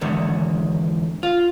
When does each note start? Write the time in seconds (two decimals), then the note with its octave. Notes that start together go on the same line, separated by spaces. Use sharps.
0.01 E2 G#2 D3 D#3
1.23 F4